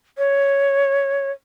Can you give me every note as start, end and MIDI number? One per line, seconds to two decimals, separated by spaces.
0.18 1.31 73